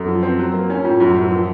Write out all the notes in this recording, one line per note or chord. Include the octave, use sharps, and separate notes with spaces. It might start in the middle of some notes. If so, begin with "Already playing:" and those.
Already playing: F#2 A4
F3
C4
F#3
A#3
C#4 D#4
A2 F4
F#2 F4
F#2 F#4
F3 A#4